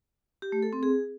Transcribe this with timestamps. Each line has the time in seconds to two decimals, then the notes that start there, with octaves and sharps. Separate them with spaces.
0.42 G4
0.52 A3
0.62 A4
0.73 C4
0.83 G#4